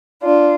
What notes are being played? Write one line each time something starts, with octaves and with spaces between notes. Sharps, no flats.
D4 F4